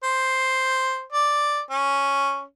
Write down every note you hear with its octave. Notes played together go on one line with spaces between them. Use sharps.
C5
D5
C#4